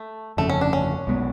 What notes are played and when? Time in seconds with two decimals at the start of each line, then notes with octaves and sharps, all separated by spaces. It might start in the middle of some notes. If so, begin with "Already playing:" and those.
Already playing: A3
0.37 G1 F2 C#3 A3
0.49 C#4
0.61 D4
0.73 C#4
1.07 B1 B2 G#3 B3